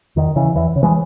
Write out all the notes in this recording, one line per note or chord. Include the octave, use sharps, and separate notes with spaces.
E2 D#3
C#3 E3
E2 E3
C#3
E3 G#3